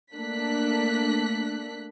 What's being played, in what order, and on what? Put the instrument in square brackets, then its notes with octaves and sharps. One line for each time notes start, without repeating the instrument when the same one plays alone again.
[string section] A3 A#3 D4 A4 F#6 B6